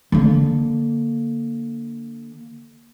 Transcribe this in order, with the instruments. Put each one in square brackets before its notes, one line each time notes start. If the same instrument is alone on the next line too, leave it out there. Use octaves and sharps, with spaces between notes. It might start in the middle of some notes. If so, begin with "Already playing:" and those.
[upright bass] D3 A#3